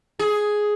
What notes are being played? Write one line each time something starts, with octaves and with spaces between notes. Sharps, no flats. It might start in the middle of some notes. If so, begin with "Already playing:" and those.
G#4